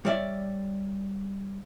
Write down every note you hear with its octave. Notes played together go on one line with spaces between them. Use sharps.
G3 C#5 D5 E5